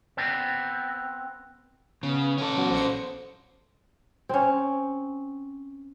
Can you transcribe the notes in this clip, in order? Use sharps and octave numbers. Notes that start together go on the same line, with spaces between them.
B3 C4
C#3 B3
C#4 A4
F#3 B3 F#4
A#1 C5 C#7
C4 C#4